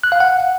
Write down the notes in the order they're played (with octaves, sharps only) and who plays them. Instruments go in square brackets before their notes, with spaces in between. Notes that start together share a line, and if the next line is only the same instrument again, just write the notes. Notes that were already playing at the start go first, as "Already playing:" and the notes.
[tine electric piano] F#6
F5
F#5